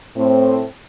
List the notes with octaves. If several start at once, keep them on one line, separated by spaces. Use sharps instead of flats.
A2 C4